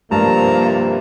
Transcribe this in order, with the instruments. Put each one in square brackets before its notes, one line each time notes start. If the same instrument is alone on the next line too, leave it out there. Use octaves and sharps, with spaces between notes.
[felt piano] G2 [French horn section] C3 F3 [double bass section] A#3 [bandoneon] A5 A#5